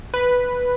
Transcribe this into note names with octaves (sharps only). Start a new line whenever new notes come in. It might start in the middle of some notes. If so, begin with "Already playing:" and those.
B4